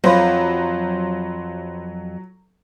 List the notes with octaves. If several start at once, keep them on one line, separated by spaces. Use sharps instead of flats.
F2 F#3 C5 C#5 F5 B5